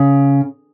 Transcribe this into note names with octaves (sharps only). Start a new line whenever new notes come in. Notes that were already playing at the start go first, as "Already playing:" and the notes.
Already playing: C#3